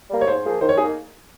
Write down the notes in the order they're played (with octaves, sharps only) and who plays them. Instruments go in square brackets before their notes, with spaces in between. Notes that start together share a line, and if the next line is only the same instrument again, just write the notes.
[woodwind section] G3 A#3
[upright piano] C#5
[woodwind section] G#2 [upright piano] C5
[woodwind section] F3 A#3 F4 G#4
[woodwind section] D#3 [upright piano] C5
[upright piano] C#5
[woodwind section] A#3 D#4 [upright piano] G#4